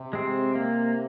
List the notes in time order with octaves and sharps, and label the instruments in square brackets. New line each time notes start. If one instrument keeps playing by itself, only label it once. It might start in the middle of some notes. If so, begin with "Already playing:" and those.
Already playing: [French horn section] C3
[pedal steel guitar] G#3 C4
A#3